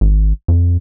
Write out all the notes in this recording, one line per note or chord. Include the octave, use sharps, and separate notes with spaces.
G#1
F2